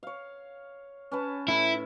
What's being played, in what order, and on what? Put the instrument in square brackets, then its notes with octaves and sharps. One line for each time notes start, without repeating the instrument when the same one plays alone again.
[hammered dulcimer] C#5 F5
C#4 B4 A5
[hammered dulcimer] A2 [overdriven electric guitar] E4